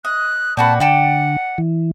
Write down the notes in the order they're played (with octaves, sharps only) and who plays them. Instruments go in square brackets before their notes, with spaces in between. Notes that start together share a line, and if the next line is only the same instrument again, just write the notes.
[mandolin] D#5 [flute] F#6
[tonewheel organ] A#2 D5 [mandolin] C4 F#4 B4 [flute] A5
[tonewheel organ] D3 [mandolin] D5 G5 A5 [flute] F#5
[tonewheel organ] E3